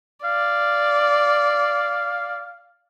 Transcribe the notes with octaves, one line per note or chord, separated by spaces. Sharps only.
D5 F5